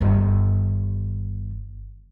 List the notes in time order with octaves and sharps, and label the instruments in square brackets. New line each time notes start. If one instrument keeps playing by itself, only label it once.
[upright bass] G1 D#3